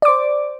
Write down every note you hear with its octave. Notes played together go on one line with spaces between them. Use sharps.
C5 D5 D6